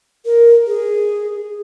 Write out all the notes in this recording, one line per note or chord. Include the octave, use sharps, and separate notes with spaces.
A#4
G#4